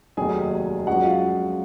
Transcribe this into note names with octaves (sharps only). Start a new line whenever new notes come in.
F1 D#2 D#3 F#3 G#4 G#5
F#2 F3 G#3 F#4 F#5
F4 F5